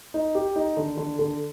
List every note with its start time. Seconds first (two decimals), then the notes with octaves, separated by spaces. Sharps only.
0.14 D#4
0.35 G4
0.56 D#4
0.77 D3
0.97 D3
1.19 D3